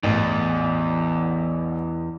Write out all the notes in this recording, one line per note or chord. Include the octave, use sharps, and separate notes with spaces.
A1 E2